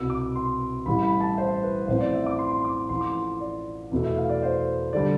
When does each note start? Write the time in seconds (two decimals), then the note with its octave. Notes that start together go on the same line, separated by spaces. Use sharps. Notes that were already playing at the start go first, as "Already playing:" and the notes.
Already playing: C2 B2 B3 E6
0.10 D6
0.36 C6
0.86 A1 A2 E3 G3 B5
1.03 B5
1.20 A5
1.38 C5
1.63 B4
1.88 A1 A2 F3 C4 C5
2.01 D5
2.14 E5
2.26 D6
2.39 C6
2.51 C6
2.64 D6
2.89 A1 A2 F3 C6
3.01 D6
3.12 C6
3.40 D5
3.92 E2 B2 A3 E4
4.05 E5
4.17 F5
4.29 D5
4.43 C5
4.93 D3 G3 D4 D5